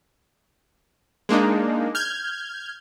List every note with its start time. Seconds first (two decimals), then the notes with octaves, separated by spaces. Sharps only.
1.29 G#3 A#3 D4 D#4
1.95 F6 G6 G#6